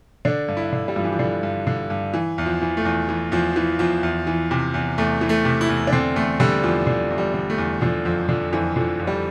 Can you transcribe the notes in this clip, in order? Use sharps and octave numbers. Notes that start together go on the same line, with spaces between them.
D3 D4
G2
E4
D3
G3
G2 F3
E3
F3
D3
G2
D3
G2
E3
E2
F3
E3
A3
E2
E3
E2 F3
E3
E2 F3
E2
E3
C3
E2
E2 A3
E3
A3
C3
E4
E2
D4
D3 C4
E2 A3
D3 G3
E2 F3
D3
E2
G3
D3
A3
E2
D3 F3
F2 F3
D3 F3
F2 E3
D3 F3
F2
G3